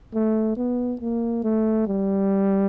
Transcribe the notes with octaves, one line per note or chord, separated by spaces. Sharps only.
A3
B3
A#3
A3
G3